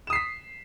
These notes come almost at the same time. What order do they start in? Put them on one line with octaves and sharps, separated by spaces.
E7 D#6 C7 B6